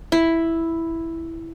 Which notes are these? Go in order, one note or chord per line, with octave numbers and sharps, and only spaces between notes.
E4